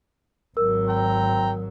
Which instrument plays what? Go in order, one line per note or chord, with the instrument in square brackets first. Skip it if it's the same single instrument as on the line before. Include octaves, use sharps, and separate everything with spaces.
[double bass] G#1 F#3 [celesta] A#4 E6
[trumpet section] C4 G5 A#5